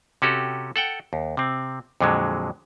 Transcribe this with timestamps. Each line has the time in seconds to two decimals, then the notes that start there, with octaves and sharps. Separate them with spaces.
0.22 C3 C#4 F#4 G4 A4
0.76 A4 F#5 G5
1.13 D#2
1.37 C3 C4
2.01 F2 A#2 D3 F#3 G#3